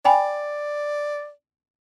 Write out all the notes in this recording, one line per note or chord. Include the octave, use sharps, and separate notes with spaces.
D5 G5 G#5 B5